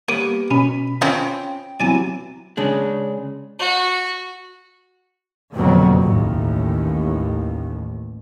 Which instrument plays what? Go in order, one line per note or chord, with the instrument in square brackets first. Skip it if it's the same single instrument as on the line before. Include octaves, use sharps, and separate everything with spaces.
[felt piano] G3 A#3 [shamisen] B3 [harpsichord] C#5 D6 D#6
[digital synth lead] B2 [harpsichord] C#4 [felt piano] B5
[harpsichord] C#3 [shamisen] C4 C#4 F4 [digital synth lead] G5
[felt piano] C3 E3 F#3 [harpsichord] D5 G#5 A5
[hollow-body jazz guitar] C#3 G#3 D4
[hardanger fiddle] F#4
[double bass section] F#1 F2 B2 D3 F#3 A#3
A1 D#2 A2